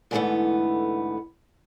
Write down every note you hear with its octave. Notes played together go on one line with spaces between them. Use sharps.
G#2 D3 E3 G#3 A3 B3